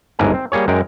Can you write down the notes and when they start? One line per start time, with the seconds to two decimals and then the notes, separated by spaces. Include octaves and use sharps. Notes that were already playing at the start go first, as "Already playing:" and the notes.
0.19 G1 D2 G#2 D3 A#4 G#5
0.34 C4
0.52 G3 A#3 G#4 C#5
0.68 F#2 G#3 A#4 G5